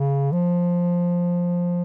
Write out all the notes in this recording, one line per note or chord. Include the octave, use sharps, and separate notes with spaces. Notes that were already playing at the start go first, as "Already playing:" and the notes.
Already playing: C#3
F3